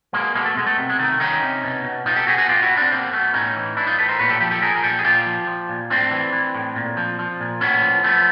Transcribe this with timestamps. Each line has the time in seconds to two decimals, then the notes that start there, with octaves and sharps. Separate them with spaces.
0.13 B2 G#3 A#3
0.35 B2 G#3 A#3
0.45 A3
0.56 B2 G#3
0.67 A3
0.78 C3
0.89 G#3
0.99 D#3 A3
1.20 D#3 C#4 D#4
1.43 C3
1.64 B2
1.84 B2
2.06 B2 D#4 F4
2.16 G4 A4
2.27 B2 F#4 G#4
2.38 F#4 G#4
2.48 B2 F4 G4
2.63 E4 F#4
2.70 B2
2.77 C4 D4
2.91 B2 A#3 C4
3.12 B2 A3 B3
3.34 A2 C#4 D#4
3.56 E3
3.76 E3 D4 E4
3.87 D#4 F4
3.98 A2 A4 B4
4.09 A#4 C5
4.19 A#2 B4 C#5
4.29 G4 A4
4.40 F3 G4 A4
4.51 G4 A4
4.62 F3 G#4 A#4
4.75 A#4
4.83 A#2 G4 A4
4.99 G#4
5.04 A#2 F4 G4
5.26 F3
5.47 F3
5.69 A#2
5.90 A2 C4 D4
6.11 E3
6.32 E3
6.55 A2
6.76 A#2
6.97 F3
7.19 F3
7.40 A#2
7.61 A2 B3 C#4
7.82 F3
8.04 F3 A3 B3